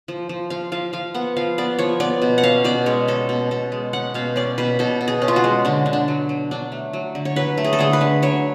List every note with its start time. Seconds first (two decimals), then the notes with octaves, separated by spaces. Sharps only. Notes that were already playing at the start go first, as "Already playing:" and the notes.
0.08 F3
0.29 F3
0.50 F3 F5
0.72 F3 F5
0.93 F3 F5
1.14 B3 F#5
1.37 F3 F5
1.58 B3 D5
1.79 F3 C#5
2.00 B3 D5
2.22 B2
2.38 F#5
2.43 C#4 F5
2.64 B2 D5
2.86 G#3 C#5
3.08 C#4 A4
3.29 B2
3.51 B2 A4
3.72 G#3
3.93 C#4 F#5
4.14 B2 F5
4.36 C#4 D5
4.58 B2 B4
4.79 B2 A4
5.01 B2
5.08 G#4
5.22 C#4
5.28 F4
5.36 F#4
5.44 G#3
5.65 D3 D4
5.86 D3
5.93 D4
6.08 F#3
6.29 F#3
6.51 F#3 D4
6.72 A3
6.93 F#3
7.15 D3
7.25 C#5
7.36 F#3 B4
7.57 A3
7.64 G#4
7.73 A4
7.79 D3 G#4
7.93 B4
8.01 D3
8.22 F#3 C#5